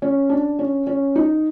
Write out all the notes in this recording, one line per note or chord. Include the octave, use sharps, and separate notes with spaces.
C#4
D4
C#4
C#4
D#4